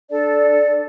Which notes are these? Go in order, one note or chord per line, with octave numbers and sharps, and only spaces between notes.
D4 A4 D5 A5